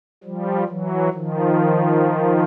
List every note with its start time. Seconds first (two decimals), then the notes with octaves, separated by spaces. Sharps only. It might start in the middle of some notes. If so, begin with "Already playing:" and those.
0.24 F3 G3
0.69 E3 F#3
1.13 D#3 F3